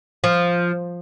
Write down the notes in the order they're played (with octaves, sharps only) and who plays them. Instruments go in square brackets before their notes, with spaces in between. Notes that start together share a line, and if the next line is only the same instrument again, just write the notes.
[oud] F3